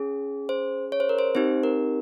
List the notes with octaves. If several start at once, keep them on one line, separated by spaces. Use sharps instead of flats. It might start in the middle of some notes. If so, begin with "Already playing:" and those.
Already playing: C#4 G#4
C5
C#5
C5
A#4
C5
C4 D#4 G4 C5
A#4